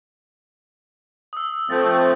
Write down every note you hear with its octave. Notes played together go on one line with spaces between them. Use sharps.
D#6 E6
F3 A3 C4 A6